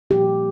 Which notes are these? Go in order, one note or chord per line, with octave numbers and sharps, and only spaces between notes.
A#2 F3 A#3 G4